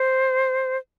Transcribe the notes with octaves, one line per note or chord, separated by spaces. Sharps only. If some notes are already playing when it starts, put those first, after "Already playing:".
Already playing: C5